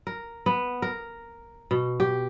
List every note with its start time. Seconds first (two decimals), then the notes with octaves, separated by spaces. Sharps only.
0.07 A#4
0.46 B3
0.82 A#4
1.71 B2
2.00 G4